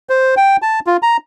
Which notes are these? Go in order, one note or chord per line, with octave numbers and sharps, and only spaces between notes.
C5
G5
A5
F4
A#5